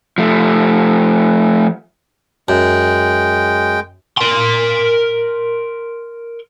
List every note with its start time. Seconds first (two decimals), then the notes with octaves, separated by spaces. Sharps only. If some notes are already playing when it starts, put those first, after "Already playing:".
0.18 F3 A3
2.49 F#2 G#3 G5
4.17 A#4 C6